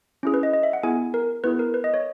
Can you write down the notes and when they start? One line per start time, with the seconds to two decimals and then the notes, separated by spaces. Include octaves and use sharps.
0.23 C#4 E4 G#4
0.34 B4
0.43 D#5
0.53 D#5
0.63 E5
0.73 F#5
0.83 B3 E4 G#4 G#5
1.14 A#4
1.44 B3 E4 G#4 B4
1.59 A#4
1.74 B4
1.84 D#5
1.94 C#5